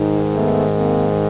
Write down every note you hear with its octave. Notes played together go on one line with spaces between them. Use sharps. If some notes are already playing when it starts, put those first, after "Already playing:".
Already playing: G#2 D#3
A3 B3
A#3 C4